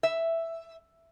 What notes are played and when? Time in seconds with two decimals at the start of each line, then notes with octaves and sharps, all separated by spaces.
0.03 E5